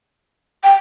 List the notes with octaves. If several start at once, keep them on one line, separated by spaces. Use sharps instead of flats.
G5